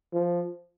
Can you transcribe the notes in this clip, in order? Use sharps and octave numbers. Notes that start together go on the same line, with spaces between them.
F3